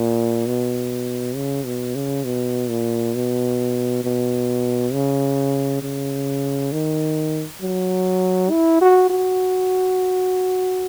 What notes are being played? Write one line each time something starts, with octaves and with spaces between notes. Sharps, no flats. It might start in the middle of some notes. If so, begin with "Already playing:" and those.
Already playing: A#2
B2
C#3
B2
C#3
B2
A#2
B2
B2
C#3
C#3
D#3
F#3
E4
F#4
F#4